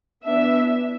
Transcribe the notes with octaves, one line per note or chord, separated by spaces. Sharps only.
E3 B3 D4 E5